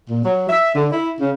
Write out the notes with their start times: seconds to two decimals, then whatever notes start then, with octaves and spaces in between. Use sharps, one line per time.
0.09 A#2
0.24 F#3
0.49 E5
0.74 D3
0.91 E4
1.20 C#3